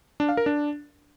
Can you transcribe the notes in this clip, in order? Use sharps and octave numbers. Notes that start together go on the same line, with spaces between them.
D4
F5
A#4
D4